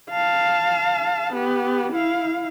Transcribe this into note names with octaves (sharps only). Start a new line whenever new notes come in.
F5 A5
B3 G4
E4 F5